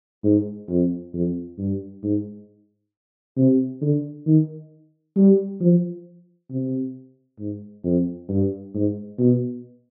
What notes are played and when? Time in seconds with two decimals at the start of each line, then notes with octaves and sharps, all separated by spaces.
0.24 G#2
0.69 F2
1.14 F2
1.58 G2
2.03 G#2
3.37 C3
3.82 D3
4.27 D#3
5.17 G3
5.61 F3
6.51 C3
7.40 G#2
7.85 F2
8.29 G2
8.74 G#2
9.19 B2